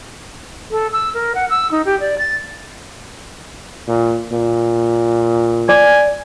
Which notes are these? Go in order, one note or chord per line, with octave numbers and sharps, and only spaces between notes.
A4
E6
A#4
F#5
E6
D#4
G4
D5
A6
A#2
A#2
D5 G#5